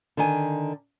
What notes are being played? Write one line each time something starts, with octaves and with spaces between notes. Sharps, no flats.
D3 D#3 G#5